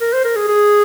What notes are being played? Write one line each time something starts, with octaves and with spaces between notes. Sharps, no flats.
A#4
C5
A#4
G#4
G#4